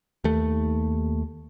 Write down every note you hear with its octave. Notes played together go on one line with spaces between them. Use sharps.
D#2 A3